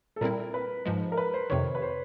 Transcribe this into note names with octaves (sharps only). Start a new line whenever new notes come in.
A4
A#2 G3 C4 E4 A#4
B4
G#2 F3 G#3
A#4
B4
C5
F2 C3 D#3 C#5
B4
C5